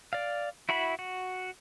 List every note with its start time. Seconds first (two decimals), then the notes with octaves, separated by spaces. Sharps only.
0.13 D5 F5
0.69 E4 F#4 E5 B5
0.99 F#4